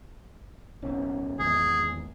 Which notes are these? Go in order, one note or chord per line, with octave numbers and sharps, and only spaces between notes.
D1 B1 C#4
G#1 E2 G#4